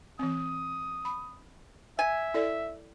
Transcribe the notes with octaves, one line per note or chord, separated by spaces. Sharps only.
E3 C4 D#6
B5
E5 G#5
E4 A4 D5